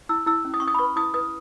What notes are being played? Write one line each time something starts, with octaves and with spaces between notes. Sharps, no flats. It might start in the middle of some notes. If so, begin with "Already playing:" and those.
E4 E6
E4 E6
C#4
D#6
C#4 C#6
D#6
B5
B4 C#6
E4 D#6
B4 D#6